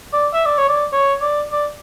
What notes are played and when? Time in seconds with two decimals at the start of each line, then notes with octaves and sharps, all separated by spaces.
0.13 D5
0.34 E5
0.45 D5
0.58 C#5
0.69 D5
0.93 C#5
1.21 D5
1.51 D5